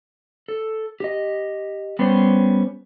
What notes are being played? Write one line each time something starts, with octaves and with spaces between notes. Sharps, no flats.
A4
G4 D#5
G3 B3 C#4 C5